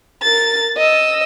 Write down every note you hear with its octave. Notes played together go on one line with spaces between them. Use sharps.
A#4 A6
D#5 E6